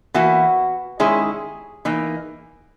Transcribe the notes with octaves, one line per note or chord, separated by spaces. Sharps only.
E3 A#3 E4 F#4
D#3 G#3 C#4 E4 G#4
E3 A#3 D#4